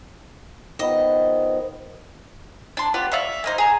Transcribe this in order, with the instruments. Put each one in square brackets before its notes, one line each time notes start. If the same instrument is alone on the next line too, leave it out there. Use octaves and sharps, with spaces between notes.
[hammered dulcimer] D#3 F3 B3 [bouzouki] D#5
[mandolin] D4 C6
B3 F4 G4 D5
D5 E5 F5 C#6
A#3 D#4 C5
G#4 A#5